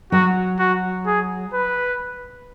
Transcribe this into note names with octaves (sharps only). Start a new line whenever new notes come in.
F#3 F#4
F#4
G#4
B4